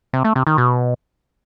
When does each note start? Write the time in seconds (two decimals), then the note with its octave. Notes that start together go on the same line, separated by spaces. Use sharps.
0.13 C3
0.24 A3
0.36 C3
0.47 D#3
0.58 B2